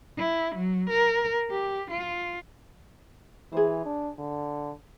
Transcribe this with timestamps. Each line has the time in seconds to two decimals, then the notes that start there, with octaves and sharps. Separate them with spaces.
0.18 E4
0.55 F#3
0.89 A#4
1.51 G4
1.91 F4
3.52 E3 G#4 C5
3.86 D4
4.18 D3